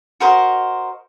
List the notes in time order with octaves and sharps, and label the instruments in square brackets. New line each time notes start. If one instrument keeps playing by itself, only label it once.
[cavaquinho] F#4 A#4 C5 D#5